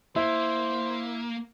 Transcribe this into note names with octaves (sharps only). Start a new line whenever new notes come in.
A#3 E4 C5